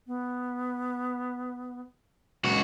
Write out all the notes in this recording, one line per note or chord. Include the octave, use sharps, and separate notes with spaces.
B3
C#2 F#4